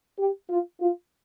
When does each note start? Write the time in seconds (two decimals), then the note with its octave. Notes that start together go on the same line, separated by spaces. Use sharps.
0.19 G4
0.50 F4
0.81 F4